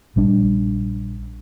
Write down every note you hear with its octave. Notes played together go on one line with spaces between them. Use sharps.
A#1 G3 D4